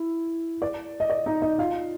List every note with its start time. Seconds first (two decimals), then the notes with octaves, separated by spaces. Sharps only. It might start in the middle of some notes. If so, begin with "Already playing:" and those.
Already playing: E4
0.62 D5
1.00 D#5
1.10 D5
1.26 D#4 D#5
1.42 D#4 D#5
1.58 F4 F5